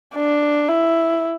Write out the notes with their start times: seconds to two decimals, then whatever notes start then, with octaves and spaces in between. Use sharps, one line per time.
0.15 D4
0.69 E4